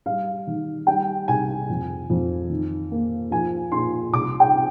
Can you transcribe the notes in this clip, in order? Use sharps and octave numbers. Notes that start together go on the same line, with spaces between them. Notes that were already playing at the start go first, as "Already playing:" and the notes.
G3 F5
D#3
G3 G5
C2 G#5
F2
F2
D#3
A#3
F3 G#5
A#2 C6
C2 D6
G5
C4